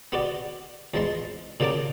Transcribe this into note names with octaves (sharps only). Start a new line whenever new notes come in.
B3 F#4 G4 D5
E2 F3 G#3 A5 C6
A#2 C#3 A#3 G4 A5 D6